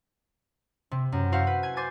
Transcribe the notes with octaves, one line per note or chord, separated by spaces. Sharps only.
C3
F#2
E4 F#4 C5 F5 F#5
B4
G#5 G#6
C5 G#5 D6 G#6 A6